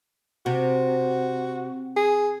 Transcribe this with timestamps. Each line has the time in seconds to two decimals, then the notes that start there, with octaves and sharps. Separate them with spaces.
0.46 C3 F#4
1.97 G#4